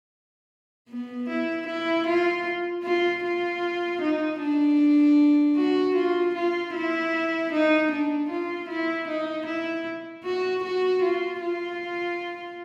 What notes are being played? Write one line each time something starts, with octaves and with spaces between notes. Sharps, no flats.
B3
E4
E4
F4
F4
F4
D#4
D4
F#4
F4
F4
E4
D#4
D4
F4
E4
D#4
E4
F#4
F#4
F4
F4